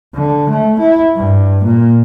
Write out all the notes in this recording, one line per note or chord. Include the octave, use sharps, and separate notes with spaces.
D3
A3
E4
G2
A#2